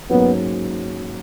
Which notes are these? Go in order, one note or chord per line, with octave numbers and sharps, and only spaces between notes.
G#2 F#3 A#3 B3 C#4